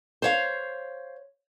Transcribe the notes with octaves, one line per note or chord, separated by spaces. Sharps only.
C5 C#5 F5